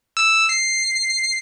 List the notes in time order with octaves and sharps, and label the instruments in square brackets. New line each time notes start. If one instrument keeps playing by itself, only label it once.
[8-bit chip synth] E6
C7